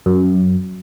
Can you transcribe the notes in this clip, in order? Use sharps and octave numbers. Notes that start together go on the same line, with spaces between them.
F#2